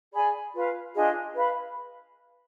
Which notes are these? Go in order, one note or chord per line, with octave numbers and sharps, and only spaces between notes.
G#4 D5 G#5 B5
F4 B4 F5
D4 F4 G#4 D#5
B4 F5 B5